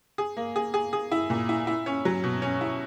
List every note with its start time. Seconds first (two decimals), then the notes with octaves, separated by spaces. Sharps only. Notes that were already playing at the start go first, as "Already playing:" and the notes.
0.18 G#4
0.37 A#3
0.56 G#4
0.74 G#4
0.93 G#4
1.12 E4
1.30 A#2
1.49 E4
1.67 E4
1.86 C#4
2.05 F#3
2.24 B2
2.42 C#4
2.61 E4